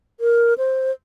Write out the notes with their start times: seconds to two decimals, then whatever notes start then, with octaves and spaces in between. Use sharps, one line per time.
0.20 A#4
0.58 C5